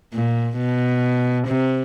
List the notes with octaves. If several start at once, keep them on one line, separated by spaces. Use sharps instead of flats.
A#2
B2
C3